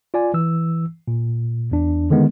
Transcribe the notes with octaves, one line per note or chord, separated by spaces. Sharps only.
F4 D5 G#5
E3 E6
A#2
E2 D4
D3 D#3 G#3 B3